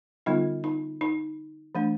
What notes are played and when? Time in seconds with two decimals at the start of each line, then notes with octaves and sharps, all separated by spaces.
0.26 D3 G3 B3 D#4 F4
0.64 D#4
1.01 D#4
1.75 E3 A3 D4